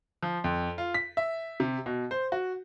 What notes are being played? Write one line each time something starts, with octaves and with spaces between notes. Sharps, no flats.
F3
F2
F4
B6
E5
C3
B2
C5
F#4